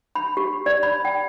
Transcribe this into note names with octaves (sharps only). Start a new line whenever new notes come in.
B5
G4
D5
B5
G5